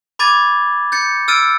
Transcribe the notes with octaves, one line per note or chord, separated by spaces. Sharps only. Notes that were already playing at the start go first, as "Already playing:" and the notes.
B5 D6 G#6 A6 D#7
G6 A6 C#7
E6 F6 A6 D7 D#7